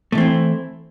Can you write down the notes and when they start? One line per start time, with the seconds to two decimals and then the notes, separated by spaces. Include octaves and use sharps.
0.12 A3
0.15 E3
0.18 C4
0.20 E4